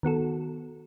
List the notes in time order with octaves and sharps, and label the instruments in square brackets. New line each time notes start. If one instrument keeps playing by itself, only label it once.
[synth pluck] D#3 B3 F#4 A4